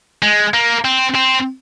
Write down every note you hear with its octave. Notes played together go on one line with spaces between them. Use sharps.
G#3
A#3
C4
C4